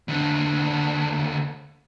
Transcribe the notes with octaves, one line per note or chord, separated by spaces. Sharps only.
D#2 D3